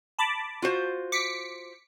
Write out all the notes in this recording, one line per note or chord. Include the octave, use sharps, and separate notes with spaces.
A5 B5 D6
F4 F#4 C5
D6 B6 C#7